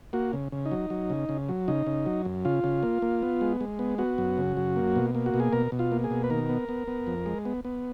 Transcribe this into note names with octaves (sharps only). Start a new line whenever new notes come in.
A#3 F#4
C#3
C#3
D#4
F#3
F#3
C#3
C#3
F#3
C#3 D#4
C#3
F#3
F#2
C#3 F4
C#3
A#3
A#3
B3
G#3
G#3
B3
B3 F#4
F#2
C#3
F#2
A#3
B2
A#3
F#4
B2
G#4
B2 A#4
B2
F4
A#3
G#4
B2
B4
D#3 A#4
B3
B3
B3
F2
G#3
B3
B3